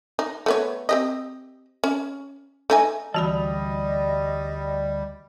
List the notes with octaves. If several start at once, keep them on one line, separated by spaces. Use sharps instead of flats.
D#4
A3 B3 C#5
C4 G4 D#5
C#4
A3 D#4 G#5
D2 E3 G3 G#3 F#4 D#5 A5 B5